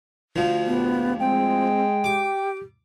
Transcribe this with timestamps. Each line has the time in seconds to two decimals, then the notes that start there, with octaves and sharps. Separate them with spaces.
0.36 D2 F3
0.67 A#1 B3 G4
1.20 G#3 C4 G5
2.04 G4 D6